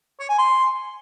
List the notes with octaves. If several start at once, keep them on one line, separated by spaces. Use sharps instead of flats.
C#5
G#5
C6